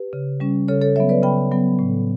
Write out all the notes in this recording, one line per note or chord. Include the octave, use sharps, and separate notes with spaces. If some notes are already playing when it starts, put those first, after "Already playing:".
Already playing: G4 B4
C#3
G3 C#4
C#3 A4 C#5
A4 C#5
F#3 B3 C#5 E5
B4 D5
C#3 G5 B5
F#3 B3
A2